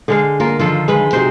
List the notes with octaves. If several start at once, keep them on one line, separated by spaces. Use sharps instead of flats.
D3 G#3 F5
A#3 F4 A#4
D3 D#3 F3 F4 A4
G#3 B4
C3 C4 D#4 F#4 C5